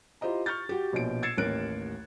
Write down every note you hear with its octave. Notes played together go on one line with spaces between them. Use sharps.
E4 F4 G4 C5 D#5 A#5
C#6 F6 G6 A6
F#4 G4
A#1 B2 C#5 D7
E6 G#6 A6 C7 C#7 E7
A1 D#2 A#4 C#5 F#6 D7